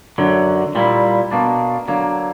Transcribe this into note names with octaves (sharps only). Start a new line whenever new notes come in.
F#2 D3 F#3
A#2 G3 A#3 E4
B2 A#3 D4
D3 F#3 A#3